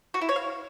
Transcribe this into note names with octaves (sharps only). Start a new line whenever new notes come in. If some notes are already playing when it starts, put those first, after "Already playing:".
F#4
E4
C#5
F5